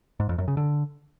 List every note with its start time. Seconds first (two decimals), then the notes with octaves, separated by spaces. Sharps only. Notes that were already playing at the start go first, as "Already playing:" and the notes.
0.20 G#2
0.29 F2
0.38 F#2
0.48 C#3
0.57 D3